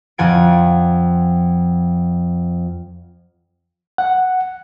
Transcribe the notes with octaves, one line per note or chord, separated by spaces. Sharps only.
F2 F3 F#5 G#5 A6 D7
F#5